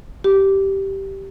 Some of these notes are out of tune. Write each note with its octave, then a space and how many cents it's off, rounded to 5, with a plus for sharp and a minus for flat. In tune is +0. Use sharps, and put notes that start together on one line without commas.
G4 -10